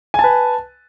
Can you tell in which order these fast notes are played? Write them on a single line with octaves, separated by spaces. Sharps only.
G#5 A5 B4